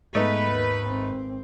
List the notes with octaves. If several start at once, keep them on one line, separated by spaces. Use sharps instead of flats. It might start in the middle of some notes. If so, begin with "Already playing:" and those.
G#2 G#3 A3 B3 D#4 B4
D#2
G#1 C4